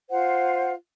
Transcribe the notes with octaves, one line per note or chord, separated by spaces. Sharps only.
F4 C5 F#5